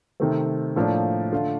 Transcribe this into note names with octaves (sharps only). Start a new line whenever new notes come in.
C3 D#3 A3 C4
A2 F3 A#3 D4
D3 A3 D4 F4